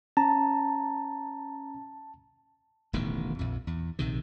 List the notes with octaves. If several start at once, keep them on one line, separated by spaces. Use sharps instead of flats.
C#4 A5 A#5
D1 A1 B2 D#3
A#1 F2
E2
A#1 C3 D#3